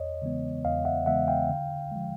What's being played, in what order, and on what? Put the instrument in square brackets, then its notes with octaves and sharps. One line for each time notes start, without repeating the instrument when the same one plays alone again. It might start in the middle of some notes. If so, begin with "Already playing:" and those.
Already playing: [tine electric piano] E2 C#5 D#5
C#3 E3 G#3 B3
E2 D#5 F5
E5 F#5
C#3 E3 G#3 B3 E5 F#5
F5 G5
D3
F3 G#3